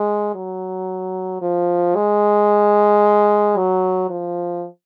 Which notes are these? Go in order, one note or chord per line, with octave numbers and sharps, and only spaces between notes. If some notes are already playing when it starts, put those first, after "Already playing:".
Already playing: G#3
F#3
F3
G#3
F#3
F3